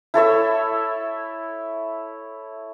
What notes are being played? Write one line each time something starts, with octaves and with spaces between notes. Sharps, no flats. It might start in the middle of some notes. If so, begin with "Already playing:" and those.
E4 A4 C#5 E5